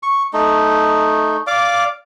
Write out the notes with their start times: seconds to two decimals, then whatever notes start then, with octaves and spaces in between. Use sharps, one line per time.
0.03 C#6
0.33 A3 D#4
1.47 D5 F5 D6